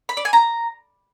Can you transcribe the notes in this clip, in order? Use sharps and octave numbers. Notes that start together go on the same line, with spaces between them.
B5
D5
G#5
A#5